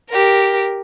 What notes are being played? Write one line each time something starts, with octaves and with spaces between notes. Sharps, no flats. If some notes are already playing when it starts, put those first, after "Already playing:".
G4 A#4